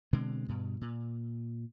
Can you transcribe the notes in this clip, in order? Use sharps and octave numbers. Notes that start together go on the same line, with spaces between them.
B2 D3 G#3 C4
G2 B2
A#2